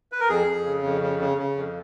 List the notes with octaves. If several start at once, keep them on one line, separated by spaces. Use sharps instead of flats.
B4
A#4
F2 G#4
F2
C#3
F2
C#3
C#3
C#3
F2